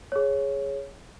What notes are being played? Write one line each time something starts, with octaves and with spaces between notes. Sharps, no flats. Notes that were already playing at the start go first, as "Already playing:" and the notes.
G#4 C#5